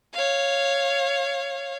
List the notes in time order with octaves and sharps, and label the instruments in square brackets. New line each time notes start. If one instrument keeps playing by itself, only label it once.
[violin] C#5 F5